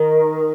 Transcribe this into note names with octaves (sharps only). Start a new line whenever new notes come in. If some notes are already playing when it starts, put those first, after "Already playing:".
Already playing: D#3